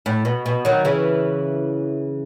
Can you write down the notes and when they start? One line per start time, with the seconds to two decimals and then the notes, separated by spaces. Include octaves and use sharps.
0.06 A2
0.25 B2
0.46 B2
0.65 D#3 F#3
0.85 C#3 E3